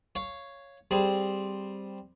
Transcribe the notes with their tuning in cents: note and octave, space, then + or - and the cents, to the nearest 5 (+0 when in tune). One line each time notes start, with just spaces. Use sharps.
C#5 +0 F5 -10
G3 +0 C4 +0 G#4 +0